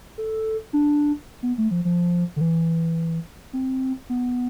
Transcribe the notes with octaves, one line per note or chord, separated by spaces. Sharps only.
A4
D4
B3
A3
F3
F3
D3
E3
C4
B3